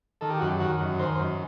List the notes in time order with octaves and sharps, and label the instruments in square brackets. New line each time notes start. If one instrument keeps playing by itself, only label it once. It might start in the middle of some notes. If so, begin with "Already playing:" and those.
[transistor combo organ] D#3 A4
G4
F#2 F#4
G4
D#3 F#4
F#2
D#3 C5
C5
F#2